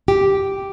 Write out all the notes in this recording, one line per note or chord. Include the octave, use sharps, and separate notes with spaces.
G4